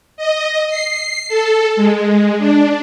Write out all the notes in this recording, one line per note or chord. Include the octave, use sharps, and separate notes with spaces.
D#5
C7
A4
G#3
D4